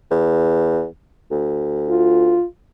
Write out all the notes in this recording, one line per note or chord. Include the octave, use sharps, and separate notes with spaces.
E2
D2
F4